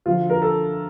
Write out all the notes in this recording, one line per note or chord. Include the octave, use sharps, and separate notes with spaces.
D2 D3 F3 F4
A#4
A4